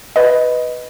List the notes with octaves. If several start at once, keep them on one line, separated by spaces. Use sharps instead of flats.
B4 D#5